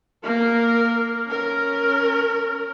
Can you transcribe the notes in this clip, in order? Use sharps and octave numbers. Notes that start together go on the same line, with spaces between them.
A#3 A#4
C#4 A#4